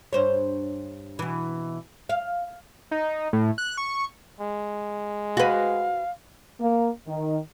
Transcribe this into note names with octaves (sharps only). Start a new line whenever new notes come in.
G2 C5 C#5
B2 E3
F5
D#4
A2
F#6
C#6
G#3
F#4 B4 F5
A#3
D#3